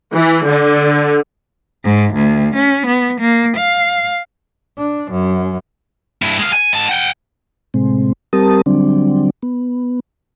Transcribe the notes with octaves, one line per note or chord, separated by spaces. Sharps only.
E3
D3
G#2
D2
C#4
B3
A#3
F5
D4
F#2
G2 E4
G#3 F5
G#5
G#2 A5
F#5 G5
A2 C3 G#3 C4
G3 C4 G4 A#4 A5 D#6
D3 F#3 G3 C4 D4
B3